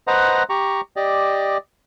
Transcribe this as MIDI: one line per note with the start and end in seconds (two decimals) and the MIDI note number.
0.07 0.43 71
0.07 0.43 72
0.07 0.43 75
0.07 0.43 78
0.07 0.43 82
0.49 0.81 67
0.49 0.81 82
0.49 0.81 85
0.96 1.57 67
0.96 1.57 74
0.96 1.57 75